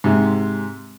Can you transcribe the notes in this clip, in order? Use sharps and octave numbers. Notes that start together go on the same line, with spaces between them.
G#2 C3